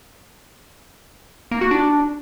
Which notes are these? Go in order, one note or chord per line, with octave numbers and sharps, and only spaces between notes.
A#3
F#4
D4